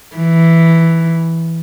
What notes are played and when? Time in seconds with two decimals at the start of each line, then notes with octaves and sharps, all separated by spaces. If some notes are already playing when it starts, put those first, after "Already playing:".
0.16 E3